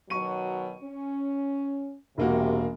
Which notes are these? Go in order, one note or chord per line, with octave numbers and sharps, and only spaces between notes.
B2 D#3 F#3 C#6 D#7
C#4
E1 C3 A#3 F#4